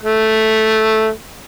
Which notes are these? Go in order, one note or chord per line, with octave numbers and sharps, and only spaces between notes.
A3